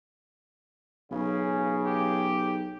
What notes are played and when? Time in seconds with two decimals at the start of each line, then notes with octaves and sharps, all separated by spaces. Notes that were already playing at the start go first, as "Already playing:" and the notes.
1.11 B1 C#3
1.86 G4